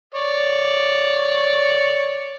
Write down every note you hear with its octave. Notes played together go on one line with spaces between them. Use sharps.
C#5 D5